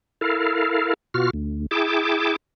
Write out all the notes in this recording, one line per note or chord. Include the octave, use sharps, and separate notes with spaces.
E4 A4 A#4 F5
B2 F4 F#4 F6
D2
E4 G#4 G5 A5 D6